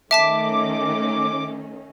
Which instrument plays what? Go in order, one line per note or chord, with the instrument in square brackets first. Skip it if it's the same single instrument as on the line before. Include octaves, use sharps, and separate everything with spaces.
[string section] D#3 A3 C#4 [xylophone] E5 A5 B6 [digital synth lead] D6